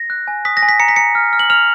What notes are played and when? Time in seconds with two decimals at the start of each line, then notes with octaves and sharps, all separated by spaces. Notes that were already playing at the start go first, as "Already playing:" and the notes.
Already playing: A#6
0.10 F#6
0.28 G#5
0.45 D#6 B6
0.57 A#6
0.63 G#5
0.69 B6
0.80 A#5 C#7
0.88 B6
0.96 A#5 C#7
1.15 F6
1.33 F6
1.39 F#7
1.50 F6 F7